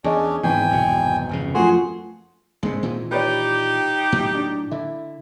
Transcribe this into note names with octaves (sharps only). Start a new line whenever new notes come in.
E2 C#4 D4 G#4 D#5
G#1 E2 G#2 G5 G#5
F1 B1 B2
F1 F2 C#3
F#2 F3 A3 F#4 G#4 C6
G#1 G2 C3 G#3 C4
A#2 D#3 E3
D#4 G4 B4 C#5 D5
A2 F#3
D4
D3 E4